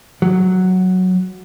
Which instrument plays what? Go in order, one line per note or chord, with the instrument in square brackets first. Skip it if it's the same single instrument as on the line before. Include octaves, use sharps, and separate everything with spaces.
[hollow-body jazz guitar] F#3